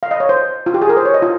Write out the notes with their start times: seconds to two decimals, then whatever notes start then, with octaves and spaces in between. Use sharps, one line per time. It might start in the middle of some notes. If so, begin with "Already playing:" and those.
0.03 F5
0.11 D#5
0.20 C#5
0.29 C5
0.66 F4
0.74 G4
0.82 G#4
0.89 A#4
0.97 C5
1.05 C#5
1.14 D#5
1.22 F4